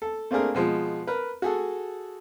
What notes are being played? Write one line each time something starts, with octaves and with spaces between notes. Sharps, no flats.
A4
A3 A#3 C4 D4 G#4 A#4
B2 F3 G#3
A#4 B4
F#4 G#4 A4